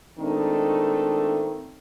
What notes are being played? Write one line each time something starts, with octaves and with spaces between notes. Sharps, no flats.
A#2 D#3 G#3 A3 C4 D4